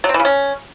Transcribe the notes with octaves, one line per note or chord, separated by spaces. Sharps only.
F#3
C4
E3
C#3
C#4